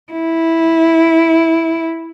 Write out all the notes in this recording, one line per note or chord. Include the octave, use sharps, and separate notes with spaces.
E4